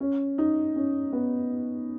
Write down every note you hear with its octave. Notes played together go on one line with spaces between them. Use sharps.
C#4
D#4
C#4
B3